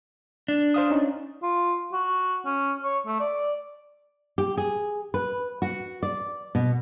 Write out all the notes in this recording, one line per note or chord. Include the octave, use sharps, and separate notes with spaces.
D4
C5 F5 D#6
C#4 D#4
F4
F#4
C#4
C#5
A3
D5
G4
G#4
B4
F#4
D5
B2